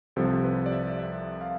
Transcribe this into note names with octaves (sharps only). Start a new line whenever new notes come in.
C2 C3 F3 A4
B4
D5
E5
E5
F5